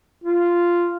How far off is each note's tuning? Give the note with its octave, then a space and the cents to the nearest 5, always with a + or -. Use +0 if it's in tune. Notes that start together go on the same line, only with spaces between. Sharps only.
F4 -5